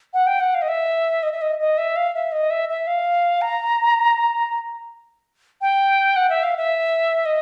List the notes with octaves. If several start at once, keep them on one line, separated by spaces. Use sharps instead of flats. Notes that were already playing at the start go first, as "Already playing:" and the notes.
F#5
G5
F#5
F5
D#5
E5
D#5
E5
D#5
D#5
E5
F5
E5
D#5
E5
E5
F5
A#5
G5
F#5
E5
F5
E5
D#5